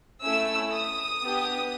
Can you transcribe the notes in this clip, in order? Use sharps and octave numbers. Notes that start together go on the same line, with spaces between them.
A3 C#4 E4 E6
D#6
B3 D4 G4